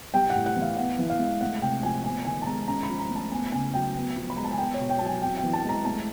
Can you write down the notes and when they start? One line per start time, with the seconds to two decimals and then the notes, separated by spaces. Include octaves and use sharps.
0.14 G3 G5
0.30 F#5
0.35 A2
0.46 F#5
0.56 E3
0.62 F5
0.77 B3 F#5
0.99 E3
1.10 F5
1.19 G#3
1.41 A3 F#5
1.62 C3 G5
1.83 F3 G#5
2.04 B3 G#5
2.25 D#3 G#5
2.42 A5
2.46 G#3 A#5
2.68 C#4 A#5
2.83 B5
2.89 F3
3.00 A#5
3.10 A3
3.16 A5
3.31 B3 G#5
3.52 C#3 G#5
3.73 F#3 G5
3.95 B3
4.16 F3
4.30 B5
4.37 G#3 A#5
4.44 A5
4.51 G#5
4.58 B3 G5
4.74 C#5
4.79 B2
4.90 G5
4.99 F#3 A5
5.06 G#5
5.22 C4 G5
5.37 G5
5.43 E3
5.53 A5
5.65 G#3 A#5
5.85 A3 A5